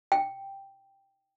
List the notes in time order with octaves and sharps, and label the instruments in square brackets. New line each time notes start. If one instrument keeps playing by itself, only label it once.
[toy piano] G5